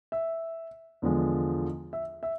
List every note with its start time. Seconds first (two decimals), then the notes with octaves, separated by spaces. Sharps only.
0.12 E5
1.02 E2 D3 F3 G#3
1.93 E5
2.23 E5